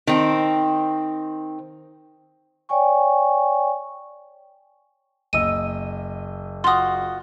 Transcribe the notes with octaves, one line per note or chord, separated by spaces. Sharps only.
D#3 C4
C#5 D5 G5 G#5 C#6
F#1 D#5 E6 D#7
F4 F#4 C6 D#6